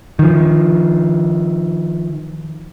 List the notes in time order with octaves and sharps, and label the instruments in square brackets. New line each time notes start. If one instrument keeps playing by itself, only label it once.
[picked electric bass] D#3 F3